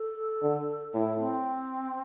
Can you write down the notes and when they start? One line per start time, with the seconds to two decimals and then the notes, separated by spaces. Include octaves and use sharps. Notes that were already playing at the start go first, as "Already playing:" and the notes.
Already playing: A4
0.42 D3
0.94 A2 E4
1.19 C4